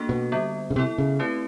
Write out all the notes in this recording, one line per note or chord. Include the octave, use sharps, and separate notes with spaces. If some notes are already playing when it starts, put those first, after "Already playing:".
Already playing: A#3 D4 F#4 A4
B2
D3 G3 B3
C#3
C3 B3 E4 A4
C#3
A3 C4 E4 G4 B4